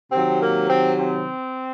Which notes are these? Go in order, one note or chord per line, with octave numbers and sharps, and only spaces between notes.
C3 D#3 F#3 C4
A#3
C4
C4